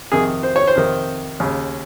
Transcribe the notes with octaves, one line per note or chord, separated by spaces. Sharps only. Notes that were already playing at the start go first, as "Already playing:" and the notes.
F2 C3 D#3 G#4
C5
C#5
C5
F2 C3 D#3
D#2 C#3